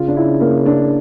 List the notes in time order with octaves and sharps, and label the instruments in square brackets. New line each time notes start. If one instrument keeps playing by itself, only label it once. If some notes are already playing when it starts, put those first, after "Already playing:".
Already playing: [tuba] C#3 [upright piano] F4
[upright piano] D4
E4
A#3
D4